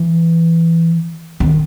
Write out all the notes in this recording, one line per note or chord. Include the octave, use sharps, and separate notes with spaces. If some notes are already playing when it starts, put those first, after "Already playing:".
Already playing: E3
D#3